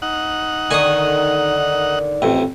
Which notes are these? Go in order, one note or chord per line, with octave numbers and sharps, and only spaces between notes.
D#4 F#5
D3 D#3 G#5 C#6 D#6
A1 F2